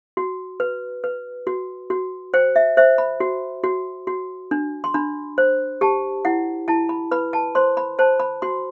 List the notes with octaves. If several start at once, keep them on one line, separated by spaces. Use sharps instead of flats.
F#4
B4
B4
F#4
F#4
C5 G5
E5
C5 E5
B5
F#4
F#4
F#4
D4
C6
D4 B5
C5
G4 A5
E4 F#5
E4 A5
B5
B4 B5
A5
C5 C6
B5
C5 A5
B5
F#4 C6